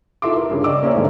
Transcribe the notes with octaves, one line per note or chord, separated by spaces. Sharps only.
D#4 F4 A4 E5 C6 D6
A#4
G2 C#3
D5 D#5 G5 D6 E6
A#3 C#4 C5 D5 E5
G#2 D3 A3 A#3